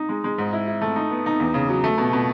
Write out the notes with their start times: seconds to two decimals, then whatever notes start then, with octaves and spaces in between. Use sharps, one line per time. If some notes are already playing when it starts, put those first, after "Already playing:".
Already playing: D#4
0.09 G#3
0.24 G#3
0.38 G#2
0.53 E4
0.67 E4
0.81 A3
0.96 D#4
1.10 B3
1.26 D#4
1.40 E2
1.54 C#3
1.69 F#3
1.84 A3
1.98 B2
2.13 B2